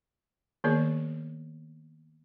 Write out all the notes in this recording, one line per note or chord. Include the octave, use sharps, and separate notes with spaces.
D#3 A#3 B3 G#4 A#4 D5